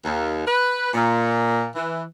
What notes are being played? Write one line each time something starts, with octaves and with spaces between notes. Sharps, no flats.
D#2
B4
A#2
E3